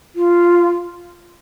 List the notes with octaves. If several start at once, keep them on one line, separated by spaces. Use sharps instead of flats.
F4